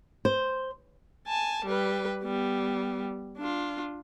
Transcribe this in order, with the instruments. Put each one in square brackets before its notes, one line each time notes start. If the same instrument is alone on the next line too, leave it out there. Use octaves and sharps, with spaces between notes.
[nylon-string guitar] C5
[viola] G#5 A5
G3 B4
G3 B3
D4 F4